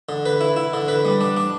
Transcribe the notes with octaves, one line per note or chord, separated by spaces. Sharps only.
D3
B4
E4
E4
D3
B4
G3
D4
D4